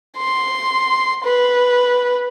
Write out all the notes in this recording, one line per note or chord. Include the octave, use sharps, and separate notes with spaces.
C6
B4